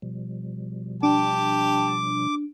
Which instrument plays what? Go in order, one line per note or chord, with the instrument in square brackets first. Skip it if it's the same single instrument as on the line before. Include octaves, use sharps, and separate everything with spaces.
[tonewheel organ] B2 F3 G3
[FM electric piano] D4 [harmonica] G4 A5 [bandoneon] D6